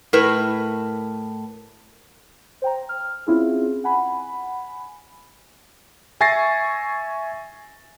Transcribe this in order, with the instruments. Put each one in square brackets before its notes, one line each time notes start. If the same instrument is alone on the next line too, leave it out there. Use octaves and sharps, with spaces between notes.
[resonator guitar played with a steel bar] A2 A#4 B4
[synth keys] C5 G5 A#5
F6
C4 C#4 E4 F4 G#4
F#5 G#5 B5
[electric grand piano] E5 G#5 C#6 A6 A#6 C7